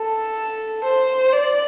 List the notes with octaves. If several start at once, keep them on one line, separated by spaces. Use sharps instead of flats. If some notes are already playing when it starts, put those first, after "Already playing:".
Already playing: A4
C5
D5